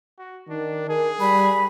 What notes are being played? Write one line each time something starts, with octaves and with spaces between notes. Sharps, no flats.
F#4
D#3 D4
G#4 A#4
G3 B5